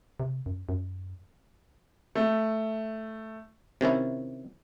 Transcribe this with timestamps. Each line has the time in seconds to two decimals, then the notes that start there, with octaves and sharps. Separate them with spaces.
0.20 C3
0.46 F#2
0.69 F#2
2.15 A3
3.81 C3 D#3 C#4 E4